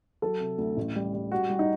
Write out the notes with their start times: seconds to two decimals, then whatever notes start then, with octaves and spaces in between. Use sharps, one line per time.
0.22 F#3 A4
0.40 C3
0.58 D2
0.77 A1
0.96 G3
1.13 G3
1.32 G3 F#4
1.50 G3
1.59 D#4